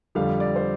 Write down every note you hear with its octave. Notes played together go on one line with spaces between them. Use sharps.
F2 D3 G3 F5
D5
C5